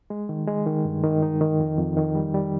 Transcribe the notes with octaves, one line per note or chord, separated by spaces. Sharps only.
G#3
D#3
G#3
D#3
G2
D#3
D#4
D#3
F2
F2
D#3
G3
G3